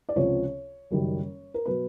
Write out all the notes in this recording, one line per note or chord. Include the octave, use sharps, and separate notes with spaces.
D5
C#2 C3 F3 C#5
F#1 F#2 D#3 G3
A#4
B2 F#3 B4